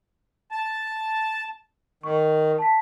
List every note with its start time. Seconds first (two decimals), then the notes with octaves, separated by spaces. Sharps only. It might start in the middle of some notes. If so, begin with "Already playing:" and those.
0.51 A5
2.03 D#3 C#6
2.58 A5 B6